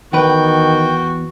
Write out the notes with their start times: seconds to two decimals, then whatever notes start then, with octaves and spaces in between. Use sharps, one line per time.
0.13 E2 D#3 F#4 B4 G5